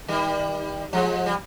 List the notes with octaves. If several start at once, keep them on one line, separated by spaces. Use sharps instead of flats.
D#3 G3
F3 G#3
G3